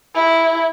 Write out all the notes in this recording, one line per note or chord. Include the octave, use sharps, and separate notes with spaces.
E4